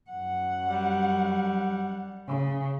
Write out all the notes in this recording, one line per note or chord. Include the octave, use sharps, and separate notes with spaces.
F#2 F#5
G3
C#3